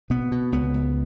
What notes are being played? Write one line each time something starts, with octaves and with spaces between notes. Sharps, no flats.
B2 B3
B2
C#2 B3
C#2